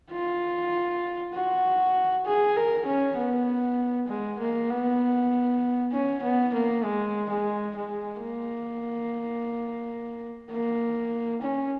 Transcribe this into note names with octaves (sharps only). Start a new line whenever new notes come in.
F4
F#4
G#4
A#4
C#4
B3
G#3
A#3
B3
C#4
B3
A#3
G#3
G#3
G#3
A#3
A#3
C#4